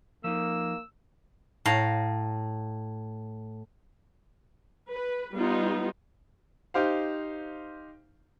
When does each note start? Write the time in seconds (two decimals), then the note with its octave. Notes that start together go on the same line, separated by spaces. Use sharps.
0.24 F3 A#3 D#4 E6
1.65 A2 F5 A#5
4.90 B4
5.34 G3 B3 D#4 F4
6.74 D#4 G4 C5 F5